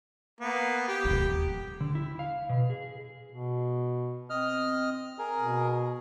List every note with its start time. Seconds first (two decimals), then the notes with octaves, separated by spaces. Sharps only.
0.41 A#3 B3
0.88 G4
1.05 D#1 G#1
1.81 D3
1.95 E4
2.19 F5
2.49 B2
2.70 G#4
3.32 B2
4.30 C4 D#5 F6
5.19 G#4 A#4
5.39 B2